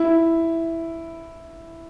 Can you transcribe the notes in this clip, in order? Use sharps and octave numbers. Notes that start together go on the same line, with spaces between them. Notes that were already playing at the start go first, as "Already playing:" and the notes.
Already playing: E4